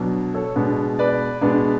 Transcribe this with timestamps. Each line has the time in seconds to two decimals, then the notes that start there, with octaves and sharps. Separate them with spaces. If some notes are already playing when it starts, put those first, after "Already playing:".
Already playing: B2 F#3 B3 D4
0.34 A4 C#5
0.56 B2 G#3 B3 D4
0.99 B4 D5
1.41 B2 G#3 B3 D4